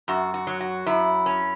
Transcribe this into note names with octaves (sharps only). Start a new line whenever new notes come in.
F#2 F#4
F#4
F#3
F#4
F#2 E4
C#4